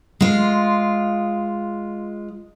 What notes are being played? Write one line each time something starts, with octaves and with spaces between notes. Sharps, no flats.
G#3 F4